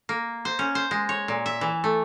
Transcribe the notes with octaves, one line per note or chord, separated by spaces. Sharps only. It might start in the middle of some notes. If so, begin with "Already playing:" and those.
A#3
C5
C#4
C5
G#3
C#5
A#2
E5
E3
A3